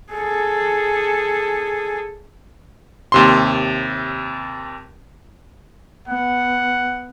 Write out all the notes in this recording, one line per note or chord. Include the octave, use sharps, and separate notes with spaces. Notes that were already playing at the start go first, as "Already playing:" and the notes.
G#4 A4
D#2 C3 C6
B3 F#5